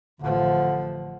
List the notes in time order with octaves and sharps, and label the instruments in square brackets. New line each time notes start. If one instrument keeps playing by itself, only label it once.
[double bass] A1 F3 [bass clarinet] D3